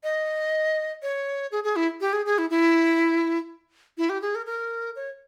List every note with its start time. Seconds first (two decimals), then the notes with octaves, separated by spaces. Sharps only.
0.04 D#5
1.02 C#5
1.52 G#4
1.64 G#4
1.76 E4
2.01 G4
2.13 G#4
2.26 G#4
2.38 E4
2.50 E4
3.98 E4
4.09 G4
4.22 G#4
4.35 A#4
4.46 A#4
4.96 C#5